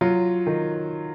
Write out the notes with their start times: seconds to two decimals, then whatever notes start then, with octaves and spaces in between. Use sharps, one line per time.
0.01 F#3 F4
0.47 D#3